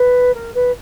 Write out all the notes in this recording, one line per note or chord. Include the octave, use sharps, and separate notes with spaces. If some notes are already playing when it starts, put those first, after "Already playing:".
Already playing: B4
A#4
B4